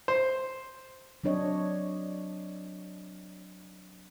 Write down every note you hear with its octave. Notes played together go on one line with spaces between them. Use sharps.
C5
F#3 C4 D4 C#5 D#5